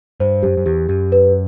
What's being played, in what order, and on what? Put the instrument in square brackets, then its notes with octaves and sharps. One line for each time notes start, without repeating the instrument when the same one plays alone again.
[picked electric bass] G2 [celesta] C5
[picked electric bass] F#2 [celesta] G4
[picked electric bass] F#2
[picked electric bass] E2 [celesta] G4
[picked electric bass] F#2 [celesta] G4
[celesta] B4